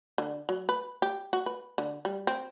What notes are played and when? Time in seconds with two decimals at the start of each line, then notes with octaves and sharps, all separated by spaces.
0.18 D3
0.49 F#3
0.69 B4
1.02 G4
1.33 F#4
1.46 B4
1.78 D3
2.05 G3
2.27 C4